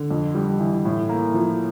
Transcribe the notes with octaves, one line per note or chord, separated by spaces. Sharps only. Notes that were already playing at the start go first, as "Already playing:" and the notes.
Already playing: D3
F2
G3
E3
A2
A#3
F3